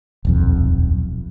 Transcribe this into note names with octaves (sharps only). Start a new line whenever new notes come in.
D#1 B1 F2